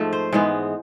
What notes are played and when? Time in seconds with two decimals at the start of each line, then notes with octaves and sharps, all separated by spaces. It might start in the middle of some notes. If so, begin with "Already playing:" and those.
Already playing: G#2 F3 A3
0.13 C5
0.33 G#2 E3 G#3 B3